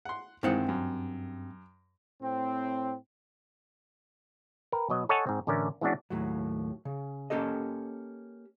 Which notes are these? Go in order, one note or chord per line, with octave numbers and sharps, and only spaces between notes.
F#5 C6
G2 D#3 E3 G#3 C4 F#5
F#2
A2 C4
A#4 B4 G5
B2 F#3 D#5
A4 C#5 D#5 F#5 G#5 A5
G#2 C4
A1 D3 A3 C#4 A#4
E3 G#3 B3 C#4 D4 F#4
D#2 A2 F#3
C#3
A#3 C#4 G4 A4 D#5